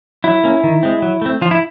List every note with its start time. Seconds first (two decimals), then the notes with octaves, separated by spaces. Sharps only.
0.24 F#3 E4
0.44 A#3 C#4
0.64 D#3
0.83 G#3 C4
1.02 F#3
1.22 A3 C4
1.41 F3 F4
1.51 E4